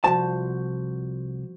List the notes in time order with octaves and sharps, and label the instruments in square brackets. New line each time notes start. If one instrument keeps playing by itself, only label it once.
[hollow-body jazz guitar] C2 F2 A5 [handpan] F3 F#4 C5